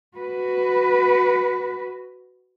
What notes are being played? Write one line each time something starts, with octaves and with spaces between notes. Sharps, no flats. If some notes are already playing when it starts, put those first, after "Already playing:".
F#4 B4